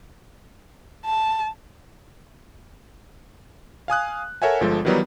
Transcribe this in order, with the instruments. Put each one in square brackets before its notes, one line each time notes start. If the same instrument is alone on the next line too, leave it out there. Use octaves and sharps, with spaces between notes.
[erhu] A5
[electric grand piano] F5 G#5 D#6 F#6
A4 A#4 C#5 E5 F#5 G#5
G1 F3 G#3 A4
D#3 E3 F#3 G3 B3 D#4